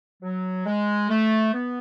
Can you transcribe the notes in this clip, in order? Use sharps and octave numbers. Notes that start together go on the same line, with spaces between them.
F#3
G#3
A3
B3